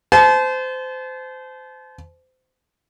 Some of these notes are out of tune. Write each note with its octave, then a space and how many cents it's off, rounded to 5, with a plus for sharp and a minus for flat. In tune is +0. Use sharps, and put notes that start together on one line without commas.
C5 -25 A5 -35